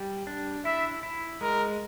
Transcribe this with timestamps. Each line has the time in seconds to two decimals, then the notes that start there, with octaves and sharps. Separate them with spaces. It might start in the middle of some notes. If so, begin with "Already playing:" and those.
Already playing: G3
0.27 D4
0.65 E4 E5
1.03 E4
1.41 G#3 A#4